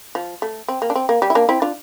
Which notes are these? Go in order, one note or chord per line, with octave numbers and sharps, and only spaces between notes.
F3
A3
C4
A#3
D4
C4
A#3
G3
E4
A#3 D4
C4 E4
D4 F4